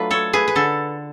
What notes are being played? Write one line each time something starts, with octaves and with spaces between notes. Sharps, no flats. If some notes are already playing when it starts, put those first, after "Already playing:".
Already playing: F#3 A3 D4 F4 B4
A4 C#5
G#4 B4
B4
D3 A4